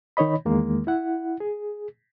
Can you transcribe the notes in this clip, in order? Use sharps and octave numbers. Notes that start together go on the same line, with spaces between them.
D#3 D#4 C#5 D#5 B5
E2 D#3 G#3 A#3
E4 F#5
G#4